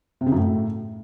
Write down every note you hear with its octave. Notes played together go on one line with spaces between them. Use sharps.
C3
C#3
F#2
A2